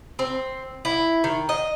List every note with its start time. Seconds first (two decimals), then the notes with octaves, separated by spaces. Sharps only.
0.19 C4
0.85 E4
1.24 D#3
1.49 D#5